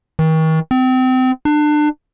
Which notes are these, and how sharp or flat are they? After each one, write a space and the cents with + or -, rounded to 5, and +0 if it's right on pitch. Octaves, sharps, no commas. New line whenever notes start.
D#3 +40
C4 -30
D4 +30